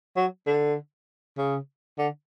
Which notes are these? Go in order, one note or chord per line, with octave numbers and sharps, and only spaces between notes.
F#3
D3
C#3
D3